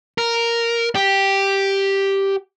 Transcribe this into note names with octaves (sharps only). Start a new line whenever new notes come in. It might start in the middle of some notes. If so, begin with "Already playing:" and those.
A#4
G4